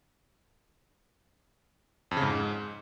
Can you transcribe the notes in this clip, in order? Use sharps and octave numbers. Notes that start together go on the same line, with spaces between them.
F2
C#3
G#2